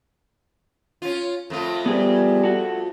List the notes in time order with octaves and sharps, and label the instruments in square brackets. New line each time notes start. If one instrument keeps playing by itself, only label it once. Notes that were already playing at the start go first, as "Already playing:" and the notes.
[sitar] C#4 F4
F2 A3 F4
[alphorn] G3 [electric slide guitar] B3 G#4 B4
[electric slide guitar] F#4 A4